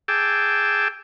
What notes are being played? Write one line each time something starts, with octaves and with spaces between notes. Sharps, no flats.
G#4 G5 A5 D6 E6